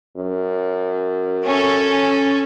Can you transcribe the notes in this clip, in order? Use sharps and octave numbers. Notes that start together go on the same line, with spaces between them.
F#2
C#4 A4